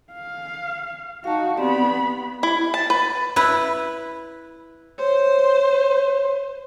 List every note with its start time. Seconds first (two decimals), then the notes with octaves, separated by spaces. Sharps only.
0.13 F5
1.24 D#4 F#4 F5 A5
1.57 B3 C4 G4 D5 B5
2.43 E4
2.74 A5
2.90 B4
3.36 E4 B4
4.98 C5 C#5